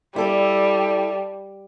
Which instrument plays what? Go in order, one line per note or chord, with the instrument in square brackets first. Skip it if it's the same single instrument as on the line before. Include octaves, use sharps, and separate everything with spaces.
[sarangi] G3 [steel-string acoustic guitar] E4 A4 D5